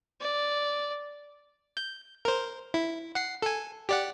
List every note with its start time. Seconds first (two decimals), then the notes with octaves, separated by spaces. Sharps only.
0.21 D5
1.77 G6
2.25 A#4 C5
2.74 E4
3.15 F#5 C7
3.42 A4 G#5
3.89 G4 D5 F#5